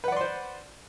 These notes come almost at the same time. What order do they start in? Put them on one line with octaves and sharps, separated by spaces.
B4 F#5 D5 C6 C5